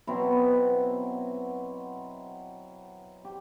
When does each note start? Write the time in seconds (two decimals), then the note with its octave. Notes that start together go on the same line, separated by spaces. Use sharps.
0.07 B2 F#3 C4 E4
3.25 G4